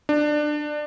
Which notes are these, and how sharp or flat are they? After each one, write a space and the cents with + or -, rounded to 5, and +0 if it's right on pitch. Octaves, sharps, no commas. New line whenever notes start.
D4 +20